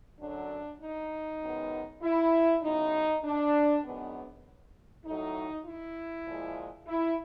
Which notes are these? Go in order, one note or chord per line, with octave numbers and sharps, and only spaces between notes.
F#2 D3 F#3 D4
D#4
F#2 D#3 G#3 B3
E4
C#3 F#3 B3 D#4
D4
F#2 D#3 G#3 B3
A2 F#3 A3 D#4
E4
A#2 F3 G#3
E4